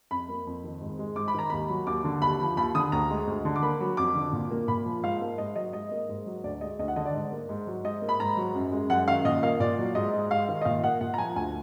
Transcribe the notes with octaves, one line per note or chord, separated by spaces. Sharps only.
F2 B5
A#3
F2
D#3
G#2
G#3
G#2 D6
B5
D#3 A#5
D#2 B5
F#3
D#2 D6
D3
D#2 B5
F3
D#2 B5
D3 D#6
D2 A#5
G#3
D2
D3
D6
A#3 B5
F#3
F2 D6
D3
A#2
A#3
A#2 B5
F3
G#2 F5
A#3
G#2 D#5
F#3 D#5
G#2 D#5
A#3
G#2
F#3
D2 D5
G#3 D#5
D2 D#5
F#5
D3 D#5
D5
G#2
A#3
G#2
F#3
G#2 D#5
A#3
B5
G#2 A#5
F#3
F#2
G#3
F#2 F#5
D#3 F5
A#2 D#5
A#3 F5
A#2 D5
F#3
G#2 D#5
G#3
G#2 F5
D#3
D#5
A#2 F5
A#3 F#5
A#2 F#5
A#5
F3 G#5
D2 G#5